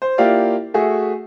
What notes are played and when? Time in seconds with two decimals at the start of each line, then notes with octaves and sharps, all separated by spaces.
0.02 C5
0.18 A#3 E4 F4 G4 D5 F5
0.74 A3 F#4 G#4 E5